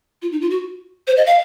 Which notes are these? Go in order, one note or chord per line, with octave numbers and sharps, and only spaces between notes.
F4
D#4
F4
F#4
C5
D#5
F5